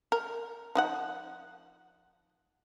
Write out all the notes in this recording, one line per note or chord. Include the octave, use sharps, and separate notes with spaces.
A#4
F3 D#4 F#5